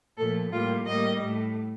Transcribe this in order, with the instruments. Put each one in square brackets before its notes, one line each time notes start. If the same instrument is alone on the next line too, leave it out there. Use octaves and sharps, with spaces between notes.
[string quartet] A#2 F3 A3 A4
A2 G3 A#3 F4
A2 G3 A#3 D#5
A2 A3